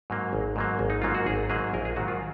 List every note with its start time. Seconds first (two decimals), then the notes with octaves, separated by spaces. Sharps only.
0.10 G#2 F#3 A#3
0.33 G#1
0.56 G#2 F#3 A#3
0.79 G#1
0.90 D#4
1.02 G#2 F#3 A#3 F4
1.15 F#4
1.26 G#1 G#4
1.50 G#2 F#3 A#3 G#4
1.73 A#1 A#4
1.85 G#4
1.96 G#2 D#3 F#3 F#4
2.08 F4